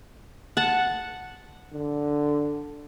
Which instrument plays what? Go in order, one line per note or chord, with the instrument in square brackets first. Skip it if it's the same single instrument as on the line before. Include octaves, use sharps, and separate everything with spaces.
[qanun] F#5 A5
[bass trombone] D3